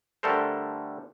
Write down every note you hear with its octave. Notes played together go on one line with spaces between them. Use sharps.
D3 G3 A3 A4 A#4 C5